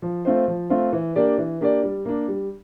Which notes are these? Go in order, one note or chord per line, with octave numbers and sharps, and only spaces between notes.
F3
A3 C4 F4 C5
F3
A3 C4 F4 C5
E3
A#3 D4 G4 D5
E3
A#3 D4 G4 D5
G3
A#3 D4
G3